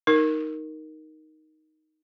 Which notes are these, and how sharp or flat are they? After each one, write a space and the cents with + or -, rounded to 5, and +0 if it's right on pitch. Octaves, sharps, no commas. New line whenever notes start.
D#4 +0 A#4 +0